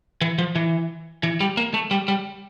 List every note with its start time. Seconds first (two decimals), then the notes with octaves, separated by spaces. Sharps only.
0.21 E3
0.38 F3
0.56 E3
1.23 E3
1.40 G3
1.57 A#3
1.74 A3
1.91 G3
2.08 G3